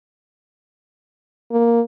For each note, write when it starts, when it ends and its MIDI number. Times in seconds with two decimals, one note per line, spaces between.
1.52 1.81 58